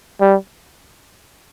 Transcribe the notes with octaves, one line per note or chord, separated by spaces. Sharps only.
G3